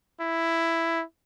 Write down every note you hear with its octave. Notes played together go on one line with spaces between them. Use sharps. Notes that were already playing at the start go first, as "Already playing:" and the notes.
E4